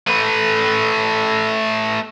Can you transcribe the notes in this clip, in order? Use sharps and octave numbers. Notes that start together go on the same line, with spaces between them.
A3 B4